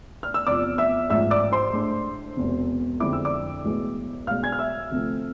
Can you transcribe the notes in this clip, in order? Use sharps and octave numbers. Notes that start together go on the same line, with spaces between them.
F6
E6
E2 C3 F3 D5 D6
E5 E6
A1 G#2 F3 E5 E6
D5 D6
C5 C6
A2 G#3 D4
E1 E2 C3
F2 D3 G#3 C4 E4 D6
E6
D5 D6
B1 A2 E3 G#3 B3
B1 B2 G#3 F5 F6
G#5 G#6
F6
E5 E6
D2 C3 F3 A3 C4